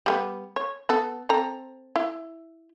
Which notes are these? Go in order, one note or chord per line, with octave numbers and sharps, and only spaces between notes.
G3 A#3 B3
C#5
B3 A4
C4 A4 A#5
E4